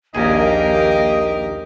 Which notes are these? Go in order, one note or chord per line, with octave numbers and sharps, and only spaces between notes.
A#1 D#2 A#3 G4 G#4 A#4 D#5